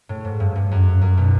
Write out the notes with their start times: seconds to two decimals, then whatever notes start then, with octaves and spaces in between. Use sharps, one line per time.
0.09 A2
0.25 G#2
0.40 G2
0.56 G2
0.71 F#2
1.01 F#2
1.17 B2